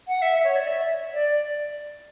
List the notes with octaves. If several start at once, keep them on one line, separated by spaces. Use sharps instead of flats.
F#5
E5
C#5
D5
E5
D5